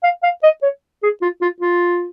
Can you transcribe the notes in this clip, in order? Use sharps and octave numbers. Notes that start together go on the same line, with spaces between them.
F5
F5
D#5
C#5
G#4
F4
F4
F4